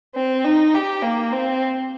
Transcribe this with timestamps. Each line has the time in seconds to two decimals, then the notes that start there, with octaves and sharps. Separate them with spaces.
0.15 C4
0.45 D#4
0.74 G4
1.03 A#3
1.33 C4